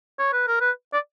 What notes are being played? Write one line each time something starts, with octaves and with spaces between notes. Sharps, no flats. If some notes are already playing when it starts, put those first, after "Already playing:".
C#5
B4
A#4
B4
D5